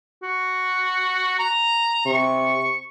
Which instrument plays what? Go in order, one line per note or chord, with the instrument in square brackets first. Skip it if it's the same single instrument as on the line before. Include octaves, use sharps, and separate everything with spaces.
[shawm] F#4
A#5
[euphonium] C3 [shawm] C#6